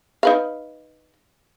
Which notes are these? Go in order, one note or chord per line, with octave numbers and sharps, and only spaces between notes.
D#4 B4 F5